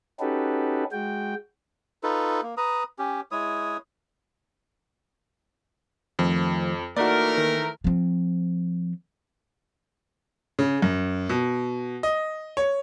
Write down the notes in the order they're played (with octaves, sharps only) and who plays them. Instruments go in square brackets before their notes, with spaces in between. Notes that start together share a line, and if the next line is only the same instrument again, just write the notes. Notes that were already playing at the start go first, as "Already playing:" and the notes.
[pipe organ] C#4 D#4 F#4 G4 A4 B4
G#3 F#4 G5
[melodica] D#4 F4 A4 B4
A#3
B4 A#5 D#6
C#4 G4
G#3 E4 C#5 D#6
[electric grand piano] F2 [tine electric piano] D#3 F3 A3
[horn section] E3 A3 A#4 [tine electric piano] A#3 D#4 [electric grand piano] F#4 D5
[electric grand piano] D#3
[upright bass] F3 C4
[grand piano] C#3
F#2
B2
D#5
C#5